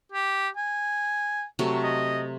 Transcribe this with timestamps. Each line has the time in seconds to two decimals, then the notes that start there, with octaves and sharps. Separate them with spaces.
0.12 G4
0.57 G#5
1.59 C3 F#3 A3
1.84 D#5